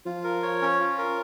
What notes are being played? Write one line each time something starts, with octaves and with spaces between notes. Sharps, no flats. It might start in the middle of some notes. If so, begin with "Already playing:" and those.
F3 F4
A#4
C#5
C#4
F4
A#4